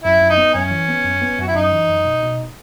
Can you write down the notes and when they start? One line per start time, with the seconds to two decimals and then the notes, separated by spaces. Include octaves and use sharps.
0.04 F#2 E4
0.21 F#2
0.30 D#4
0.37 B3
0.54 F#2 C#4
0.71 E3
0.88 B3
1.05 F#2
1.22 B3
1.39 F#2 F#4
1.48 E4
1.55 F#2 D#4
1.72 E3
1.89 F#2
2.05 B2
2.22 B2